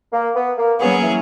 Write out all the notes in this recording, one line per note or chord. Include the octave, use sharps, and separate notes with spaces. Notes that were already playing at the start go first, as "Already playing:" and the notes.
A#3
B3
A#3
F#3 A#3 B3 C#4 G#4 C#5
E3